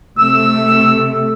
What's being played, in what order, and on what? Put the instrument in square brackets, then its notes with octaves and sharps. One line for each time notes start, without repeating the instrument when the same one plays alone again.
[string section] C3 A3 [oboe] E6